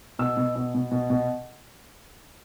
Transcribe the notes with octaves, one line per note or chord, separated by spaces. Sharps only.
B2 E6
B2
B2
B2
B2
B2